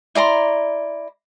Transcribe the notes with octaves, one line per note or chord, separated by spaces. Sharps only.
E4 D5 A#5 C6